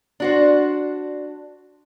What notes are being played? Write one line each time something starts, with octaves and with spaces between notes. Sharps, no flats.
D4 F#4 C5